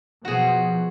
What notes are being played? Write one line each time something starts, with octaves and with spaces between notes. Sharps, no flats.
B2 F3 F#4 G#4